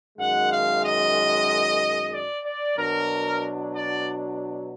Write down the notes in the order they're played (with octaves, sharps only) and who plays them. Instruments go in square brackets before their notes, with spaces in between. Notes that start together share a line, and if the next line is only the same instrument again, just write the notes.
[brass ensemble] F#2 D#3 G#3 F#5
F5
D#5
D5
D5
B2 F#3 D4 A#4
D5